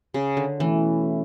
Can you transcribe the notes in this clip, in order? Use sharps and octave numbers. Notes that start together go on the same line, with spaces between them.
C#3
D3
B2 E3 A3 C#4 E4